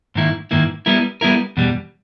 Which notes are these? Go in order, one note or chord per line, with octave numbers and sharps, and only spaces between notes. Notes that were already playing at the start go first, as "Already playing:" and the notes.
G#2 D#3 A#3 E4
G#2 D#3 A#3 E4
G3 B3 E4 A#4
G3 B3 E4 A#4
E2 B2 G3